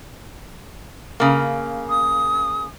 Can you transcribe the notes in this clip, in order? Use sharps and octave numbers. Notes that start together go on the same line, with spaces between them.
C#3 A#3
D#6